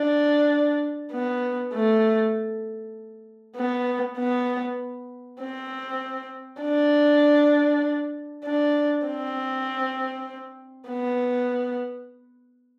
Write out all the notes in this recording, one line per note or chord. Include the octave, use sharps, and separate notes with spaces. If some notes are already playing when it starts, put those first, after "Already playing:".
Already playing: D4
B3
A3
B3
B3
C4
D4
D4
C4
B3